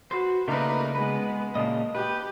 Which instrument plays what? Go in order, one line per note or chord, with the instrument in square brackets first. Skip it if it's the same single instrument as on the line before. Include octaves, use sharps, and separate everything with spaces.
[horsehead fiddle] F#4 [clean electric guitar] B4 C5
[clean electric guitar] C#3 D5 [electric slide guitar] A3 A#3 D#4 [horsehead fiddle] A#4 B4
[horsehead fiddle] G#3 B3 [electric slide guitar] B4
[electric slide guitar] A#2 C#3 A#3 [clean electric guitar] D#5 A5
[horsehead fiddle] G4 [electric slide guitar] B4